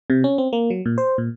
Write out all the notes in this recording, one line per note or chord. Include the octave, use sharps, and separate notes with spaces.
C3
C#4
C4
A#3
F#3
A#2
C5
A#2